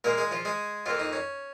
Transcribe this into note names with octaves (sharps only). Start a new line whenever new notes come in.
A#2 G#3 A#3 A#4
G#3 G#4
F3 F4
G#3 G#4
F2 F3 A#3 F4
D#4
C#4